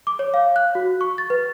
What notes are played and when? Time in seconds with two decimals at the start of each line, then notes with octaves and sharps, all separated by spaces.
0.07 D6
0.19 C#5
0.34 F5
0.56 F#6
0.75 F#4
1.01 C#6
1.18 A6
1.30 B4